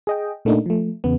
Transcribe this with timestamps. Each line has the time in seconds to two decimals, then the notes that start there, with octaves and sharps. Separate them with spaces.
0.07 G#4 D#5 G5
0.45 A#2 A3 A#3 D4 D#4
0.66 F3 A3
1.04 E2 C#3 B3